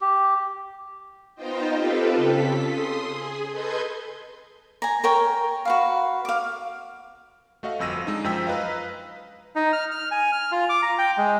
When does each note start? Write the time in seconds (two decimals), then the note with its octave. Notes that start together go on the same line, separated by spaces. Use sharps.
0.01 G4
1.35 B3 D#4 F4 C5 D#5 G5
1.73 C4 F4 G4 A4 B4
2.16 C#3 A4 B6
2.66 C6 D#6
3.03 G#4
3.50 A4 B4 D#5 C6 G6 G#6
4.82 G#5 A#5
5.04 A#4 C#5 G5
5.65 F#4 B4 F5
6.25 F5 D6
7.63 A3 F#4 D#5 F5
7.79 G1 F2 E6 A#6 D#7
8.07 G#3 D4 D#4
8.24 F#2 F3 G5 E6 B6
8.45 B4 D#5 F5 A#5
9.56 D#4
9.73 F6
9.91 F6
10.11 G#5
10.32 F6
10.52 F4
10.69 D6
10.82 A#5
10.98 G5
11.18 G#3